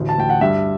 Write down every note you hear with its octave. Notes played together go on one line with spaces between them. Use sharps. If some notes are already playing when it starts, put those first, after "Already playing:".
Already playing: A1 D2
A5
D2 G5
F#5
G2 E5